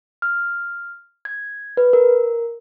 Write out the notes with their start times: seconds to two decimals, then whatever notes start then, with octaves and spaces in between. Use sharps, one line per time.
0.22 F6
1.25 G#6
1.77 B4
1.93 A#4